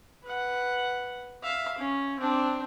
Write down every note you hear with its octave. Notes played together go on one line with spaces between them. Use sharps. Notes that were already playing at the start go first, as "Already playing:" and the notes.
B4 F#5
E5 F5
C#4
C4 D4